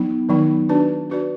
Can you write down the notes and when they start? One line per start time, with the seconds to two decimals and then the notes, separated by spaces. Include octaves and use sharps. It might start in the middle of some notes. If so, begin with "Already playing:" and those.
Already playing: F#3 B3 D#4
0.29 D#3 F#3 B3 D#4
0.69 D4 F#4 B4 D5
1.10 D4 F#4 B4 D5